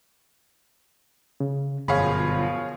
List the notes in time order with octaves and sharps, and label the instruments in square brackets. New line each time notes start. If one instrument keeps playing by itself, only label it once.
[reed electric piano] C#3
[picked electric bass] G1 [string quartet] F#2 B2 F3 [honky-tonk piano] G#4 C#5 F5 [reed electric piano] B5